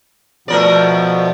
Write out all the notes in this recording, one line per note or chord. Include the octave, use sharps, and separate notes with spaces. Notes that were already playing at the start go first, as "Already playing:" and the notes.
B2 F3 A3 B3 A#4 D5